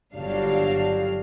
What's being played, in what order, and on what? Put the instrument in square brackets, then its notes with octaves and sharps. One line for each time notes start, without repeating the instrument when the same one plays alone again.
[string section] G1 G2 F#3 G3 D4 F5